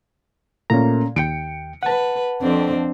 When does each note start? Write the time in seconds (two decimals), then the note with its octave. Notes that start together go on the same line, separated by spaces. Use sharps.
0.70 A#2 A3 A#3 C#4 A#5
1.16 D#2 G5 C#7 D7
1.83 B4 F#5 A5
2.42 F2 C4 D4